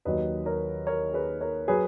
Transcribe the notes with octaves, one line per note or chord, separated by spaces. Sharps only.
D#2 D#3 F#3 B4 D#5
A#4 C#5
A#4 C#5
G#4 B4
A#4 C#5
F#3 G#4 B4